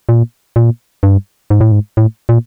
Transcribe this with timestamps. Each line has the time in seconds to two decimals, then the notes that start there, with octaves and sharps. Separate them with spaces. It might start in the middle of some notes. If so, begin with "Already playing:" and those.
0.09 A#2
0.56 A#2
1.03 G2
1.50 G#2
1.61 A2
1.72 G#2
1.97 A2
2.29 A#2